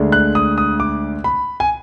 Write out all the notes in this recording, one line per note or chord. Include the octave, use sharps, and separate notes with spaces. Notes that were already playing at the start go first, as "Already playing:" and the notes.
Already playing: D2 D3 G#3 D4
F#6
D#6
D#6
D6
B5
G#5